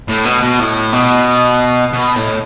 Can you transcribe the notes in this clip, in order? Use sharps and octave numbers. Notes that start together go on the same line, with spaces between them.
A2
B2
B2
A2
B2
B2
A2